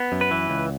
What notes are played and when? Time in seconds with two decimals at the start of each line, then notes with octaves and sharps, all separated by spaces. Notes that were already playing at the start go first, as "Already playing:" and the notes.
Already playing: B3
0.12 F#2
0.21 B4
0.31 E3
0.50 C#2